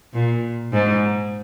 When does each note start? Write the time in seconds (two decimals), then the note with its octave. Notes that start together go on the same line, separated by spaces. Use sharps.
0.13 A#2
0.73 G#2